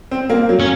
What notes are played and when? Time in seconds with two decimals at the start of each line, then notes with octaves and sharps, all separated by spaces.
0.11 C4
0.30 A#3
0.49 F#3
0.60 C#4